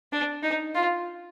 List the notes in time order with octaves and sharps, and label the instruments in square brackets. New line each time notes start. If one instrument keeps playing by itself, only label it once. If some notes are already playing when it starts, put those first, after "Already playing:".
[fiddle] D4
D#4
F4